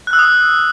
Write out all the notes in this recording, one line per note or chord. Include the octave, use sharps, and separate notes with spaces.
F#6
E6
D#6
F#6